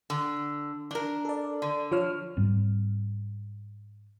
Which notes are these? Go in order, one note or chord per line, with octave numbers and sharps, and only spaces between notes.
D3
D4 A#4
A4 D5
D3
F3 C#5 F6
G#2 G3 C4